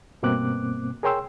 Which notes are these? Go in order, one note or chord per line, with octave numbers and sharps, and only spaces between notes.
G2 B2 A#3 C4 D6 F#6
G#4 A#4 C#5 G5 C6 E6